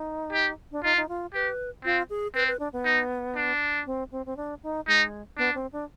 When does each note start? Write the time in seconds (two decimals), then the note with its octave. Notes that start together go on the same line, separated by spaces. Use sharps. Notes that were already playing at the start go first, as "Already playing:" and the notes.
Already playing: D#4
0.33 G4
0.72 D4
0.84 D#4 F4
0.97 D#4
1.09 F4
1.33 G4 B4
1.84 C4 F4
2.10 G#4
2.35 C4 B4
2.48 B4
2.59 D4
2.73 B3
2.85 D#4
3.36 D4
3.86 C4
4.12 C4
4.26 C4
4.37 D4
4.63 D#4
4.87 G#3 D#4
5.38 B3 D4
5.55 C4
5.72 D4